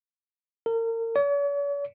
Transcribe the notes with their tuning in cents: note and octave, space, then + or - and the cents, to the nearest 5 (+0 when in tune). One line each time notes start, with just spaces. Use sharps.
A#4 -35
C#5 +45